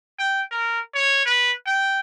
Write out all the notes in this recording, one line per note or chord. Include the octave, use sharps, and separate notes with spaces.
G5
A#4
C#5
B4
G5